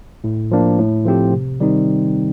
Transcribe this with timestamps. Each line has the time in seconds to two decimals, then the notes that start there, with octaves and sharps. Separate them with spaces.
0.24 A2
0.51 F3 A#3 D4
0.79 A2
1.05 F3 A3 C4 G4
1.33 C3
1.60 D#3 G3 C4 D#4